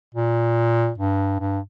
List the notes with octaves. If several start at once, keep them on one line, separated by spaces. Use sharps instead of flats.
A#2
G2
G2